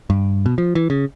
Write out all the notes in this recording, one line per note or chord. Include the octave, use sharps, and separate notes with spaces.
G2
B2
F3
E3
C#3